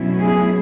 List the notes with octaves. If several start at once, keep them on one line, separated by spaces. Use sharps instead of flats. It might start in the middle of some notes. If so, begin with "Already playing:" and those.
Already playing: B2 F#3 A3 C#4 E4
G#4